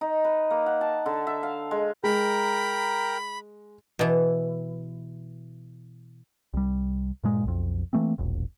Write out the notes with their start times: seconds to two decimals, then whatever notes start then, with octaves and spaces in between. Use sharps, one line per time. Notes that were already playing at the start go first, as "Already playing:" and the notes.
0.01 D#4
0.24 B4
0.50 A#3
0.66 F#5
0.81 A5
1.06 D3
1.27 E5
1.43 F5
1.71 G#3
2.04 G#3 A#4 G5 A#5 B5
3.99 B2 E3
6.54 C2 G3
7.24 G2 A#2 G#3
7.44 B1 F2
7.93 E3 A3 A#3 C4
8.18 E1 A#1